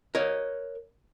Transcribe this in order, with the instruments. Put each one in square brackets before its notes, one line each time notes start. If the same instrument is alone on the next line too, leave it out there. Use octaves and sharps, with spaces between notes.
[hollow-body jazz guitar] A#4 C#5 D#5